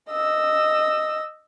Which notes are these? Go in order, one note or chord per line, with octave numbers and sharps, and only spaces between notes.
D#5 E6